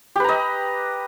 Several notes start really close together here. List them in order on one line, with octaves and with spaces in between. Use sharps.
G4 B4 A#5 D#5